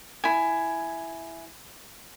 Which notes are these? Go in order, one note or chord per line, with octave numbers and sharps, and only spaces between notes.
E4 G#5